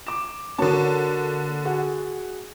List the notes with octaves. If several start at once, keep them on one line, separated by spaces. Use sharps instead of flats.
D6 E7
D3 A#3 F#4 C#5 A5
F#4 G#4 F#5